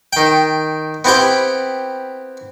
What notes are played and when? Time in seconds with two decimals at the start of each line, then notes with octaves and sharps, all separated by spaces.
0.13 D#3 G5
1.05 B3 C4 E4 G4 G5